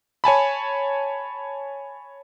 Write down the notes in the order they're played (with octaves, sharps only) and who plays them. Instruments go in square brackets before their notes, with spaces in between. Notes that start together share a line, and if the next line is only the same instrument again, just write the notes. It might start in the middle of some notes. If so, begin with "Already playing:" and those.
[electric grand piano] C#5 G#5 A5 B5